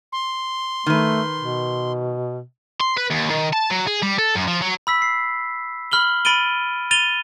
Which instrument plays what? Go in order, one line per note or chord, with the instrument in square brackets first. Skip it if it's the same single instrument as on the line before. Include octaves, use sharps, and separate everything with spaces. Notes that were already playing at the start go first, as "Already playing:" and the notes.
[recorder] C6
[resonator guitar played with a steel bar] D#3 B4 [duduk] A3
[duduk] B2
[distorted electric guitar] C6
B4
D#2
D#3
A5
F#3
G#4
G3
A4
F#2
F3
F#3
[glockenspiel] B5 E6 B6
C7
B5 F6 F#7 G7
B5 A6 D7 D#7 G7
A6 D#7 F7 G7